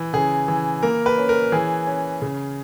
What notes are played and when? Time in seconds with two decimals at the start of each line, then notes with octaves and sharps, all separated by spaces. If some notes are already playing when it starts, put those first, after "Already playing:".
Already playing: E3
0.13 C#3 G#4
0.48 E3
0.83 A#3 A#4
1.06 B4
1.18 C#4
1.29 A#4
1.52 E3 G#4
1.87 C#4
2.22 C#3